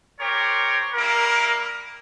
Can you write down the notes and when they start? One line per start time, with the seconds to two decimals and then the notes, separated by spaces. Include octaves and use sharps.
0.19 C4 G4 A#4 C#5
0.94 G3 A#3 E4 A#4